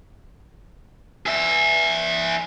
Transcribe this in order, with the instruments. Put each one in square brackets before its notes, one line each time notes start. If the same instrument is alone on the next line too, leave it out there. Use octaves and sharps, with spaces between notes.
[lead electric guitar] G#4 E5